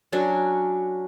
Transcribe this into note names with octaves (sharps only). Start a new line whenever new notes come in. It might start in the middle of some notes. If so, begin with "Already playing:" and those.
F#3 C#4 D4 F#4